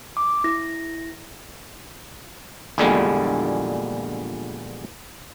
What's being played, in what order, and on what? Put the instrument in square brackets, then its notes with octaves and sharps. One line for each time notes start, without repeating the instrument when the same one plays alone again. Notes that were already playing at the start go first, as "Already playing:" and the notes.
[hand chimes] D6
E4 A#6
[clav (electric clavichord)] A#1 E2 A#2 D3 G3 G#3